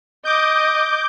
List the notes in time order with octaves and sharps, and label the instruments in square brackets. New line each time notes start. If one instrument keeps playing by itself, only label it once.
[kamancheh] D#5 [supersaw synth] D6 G6